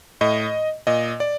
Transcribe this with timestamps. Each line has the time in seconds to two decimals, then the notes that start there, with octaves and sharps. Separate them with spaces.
0.21 A2 D#5
0.87 A#2 D#5
1.20 D5